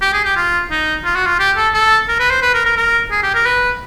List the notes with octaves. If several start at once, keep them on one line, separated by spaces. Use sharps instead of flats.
G4
G#4
G4
F4
D#4
F4
F#4
F4
G4
A4
A4
A#4
B4
C5
B4
A#4
A#4
A#4
G#4
G4
A#4
B4